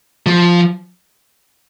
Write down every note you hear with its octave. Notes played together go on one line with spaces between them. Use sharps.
F3